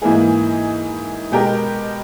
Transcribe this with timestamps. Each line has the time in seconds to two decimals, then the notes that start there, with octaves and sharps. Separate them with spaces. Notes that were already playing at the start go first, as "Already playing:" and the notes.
0.02 G#2 E3 A#3 E4 G#4
1.31 B2 G#3 B3 G4 A#4